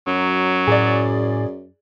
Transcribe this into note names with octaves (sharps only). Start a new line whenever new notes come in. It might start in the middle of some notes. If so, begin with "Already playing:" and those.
F#2 F#3
A2 G#4 D5